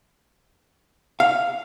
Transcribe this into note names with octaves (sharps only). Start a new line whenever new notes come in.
F5